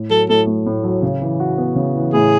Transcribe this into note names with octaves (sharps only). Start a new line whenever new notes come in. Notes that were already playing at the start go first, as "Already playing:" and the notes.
Already playing: A2
F#3 A4
A2 A4
A3
A2
F#3
C#3
E3
F#4
B3
C#3
E3
A2 G#4